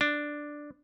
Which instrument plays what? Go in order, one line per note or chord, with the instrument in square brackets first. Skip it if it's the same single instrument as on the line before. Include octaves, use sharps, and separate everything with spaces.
[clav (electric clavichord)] D4